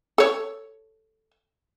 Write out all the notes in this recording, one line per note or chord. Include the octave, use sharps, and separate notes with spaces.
A4 C#5